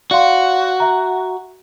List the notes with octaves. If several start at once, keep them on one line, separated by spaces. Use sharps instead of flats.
F#4 D5 F5 C6
E5 A#5